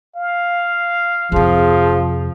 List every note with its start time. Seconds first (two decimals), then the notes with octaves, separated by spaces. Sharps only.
0.16 F5
1.32 F2 C3 F3 G#4